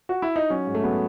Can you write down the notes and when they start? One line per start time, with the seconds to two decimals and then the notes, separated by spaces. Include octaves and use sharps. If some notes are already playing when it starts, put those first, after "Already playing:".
0.09 F#4
0.22 E4
0.36 D#4
0.50 F#3 C#4
0.67 G#2
0.75 A3
0.84 F#3 B3